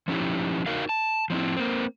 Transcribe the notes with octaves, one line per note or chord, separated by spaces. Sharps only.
F3 C#4 D#4 E4 G4
D#4 F#4 A#4 F5
A5
F3 C4 E4
A#3 C4